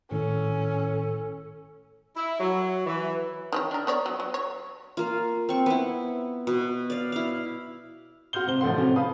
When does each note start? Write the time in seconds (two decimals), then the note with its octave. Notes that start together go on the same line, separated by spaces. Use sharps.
0.11 G#1 A2 D#3 C#4 A4
2.16 E4
2.40 F#3
2.86 E3
3.52 D#3 E3 C#5
3.71 D4 A#4
3.87 B3 C#5 D5
4.06 F#3
4.20 F#3
4.34 C#5
4.97 A#3 F4
5.49 C4 C#6
5.66 B3 E4
6.47 B2
6.90 D5 F5
7.12 E4 F5
8.33 F#4 C6 F6 G6 G7
8.47 C3 C5 G7
8.61 A1 F3 A3 F#5 C6
8.77 C3 A3 C4 C#4 F#4
8.96 B4 F5 A5 D#6